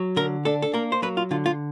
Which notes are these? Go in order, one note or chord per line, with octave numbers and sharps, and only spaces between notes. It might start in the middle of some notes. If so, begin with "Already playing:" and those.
Already playing: F#3
D3 A#4
D4 A4
A4
A#3 A#4
C5
F#3 B4
F4
D3 F4
F4